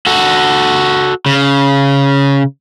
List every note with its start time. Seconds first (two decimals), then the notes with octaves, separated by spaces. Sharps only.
0.07 F#4 A4
1.26 C#3